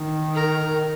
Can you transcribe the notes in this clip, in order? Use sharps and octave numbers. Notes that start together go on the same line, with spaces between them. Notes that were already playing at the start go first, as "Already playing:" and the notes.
Already playing: D#3
A#4